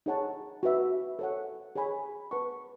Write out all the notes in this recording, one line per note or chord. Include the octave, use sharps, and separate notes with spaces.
D#4 G#4 C#5 F#5 A5
F#4 B4 E5
A4 C#5 F#5
G#4 C#5 G#5 B5
B4 F#5 A5 C#6